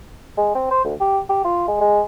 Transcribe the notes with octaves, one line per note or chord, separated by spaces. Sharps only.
G#3
C4
C5
D2
G4
G4
F4
G#3
G#3